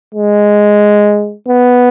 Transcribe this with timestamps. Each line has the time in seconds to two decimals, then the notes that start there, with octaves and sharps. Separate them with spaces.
0.15 G#3
1.48 B3